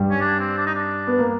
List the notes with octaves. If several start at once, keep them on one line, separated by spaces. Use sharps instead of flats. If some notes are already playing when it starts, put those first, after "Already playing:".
Already playing: G2 G3
C#4
D4
C4
D4
D#4
D4
B3
A#3